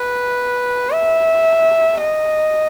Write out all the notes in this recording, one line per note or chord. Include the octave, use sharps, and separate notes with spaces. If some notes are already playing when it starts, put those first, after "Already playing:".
Already playing: B4
E5
D#5